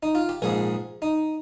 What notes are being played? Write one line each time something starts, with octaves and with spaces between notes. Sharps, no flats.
D#4
F4
G4
A#1 G#2 F3 G#4
D#4